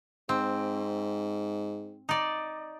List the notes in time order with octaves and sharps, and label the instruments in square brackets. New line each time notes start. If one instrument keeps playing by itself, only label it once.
[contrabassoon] G#2 [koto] C4
[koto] D#4 D5